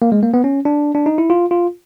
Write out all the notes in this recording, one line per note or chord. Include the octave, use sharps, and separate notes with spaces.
A#3
G#3
A#3
B3
C#4
D4
D4
D#4
E4
F4
F4